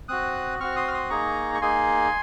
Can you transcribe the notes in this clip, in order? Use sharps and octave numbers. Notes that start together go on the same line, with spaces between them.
C4 F#4 D#6 F#6
C4 F#4 C#6 F6
C6 D#6
F6
C6 D#6
A#3 D#4 G#4 A#5 C#6
C#6
A#3 D#4 G#4 G#5 C6